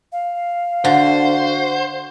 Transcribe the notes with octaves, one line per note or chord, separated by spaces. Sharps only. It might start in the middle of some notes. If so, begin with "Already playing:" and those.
F5
D3 F#4 C5